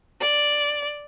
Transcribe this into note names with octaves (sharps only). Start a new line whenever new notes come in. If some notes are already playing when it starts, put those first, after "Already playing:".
D5